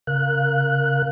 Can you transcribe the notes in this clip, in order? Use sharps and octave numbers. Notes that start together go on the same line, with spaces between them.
C#3 A#4 F5 F#6